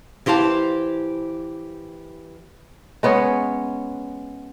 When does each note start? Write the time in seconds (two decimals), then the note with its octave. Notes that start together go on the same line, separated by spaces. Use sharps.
0.26 E3 G4 C5 F5 A5
3.03 G#3 B3 C#4 C#5